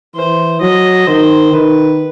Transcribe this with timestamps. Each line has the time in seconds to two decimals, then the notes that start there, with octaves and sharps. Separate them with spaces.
0.15 E3 C5
0.61 F#3 D#5
1.07 D#3 C5
1.53 D#3 B4